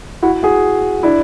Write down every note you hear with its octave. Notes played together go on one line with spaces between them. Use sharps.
E4 F#4
F#4 G#4
D4 E4